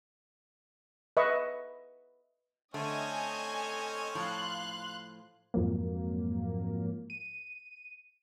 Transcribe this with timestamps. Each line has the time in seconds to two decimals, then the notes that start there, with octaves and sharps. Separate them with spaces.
1.17 B4 D#5 E5 C#6
2.74 D3 A3 C4 C#4 C#5 D#5 G#5
4.15 A2 F3 F5 C6 F#6
5.54 F2 G#2 F3 F#3 A#3
7.10 D#7